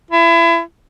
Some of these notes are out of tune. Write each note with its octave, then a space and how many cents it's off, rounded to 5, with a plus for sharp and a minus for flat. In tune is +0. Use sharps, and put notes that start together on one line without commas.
E4 +30